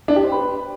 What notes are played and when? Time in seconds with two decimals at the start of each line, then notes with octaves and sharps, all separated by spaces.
0.08 D4
0.16 G4
0.24 C5
0.32 B4